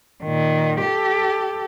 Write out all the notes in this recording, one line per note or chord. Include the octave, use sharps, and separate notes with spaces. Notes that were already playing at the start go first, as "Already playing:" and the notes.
A#2 D#3
G4 A4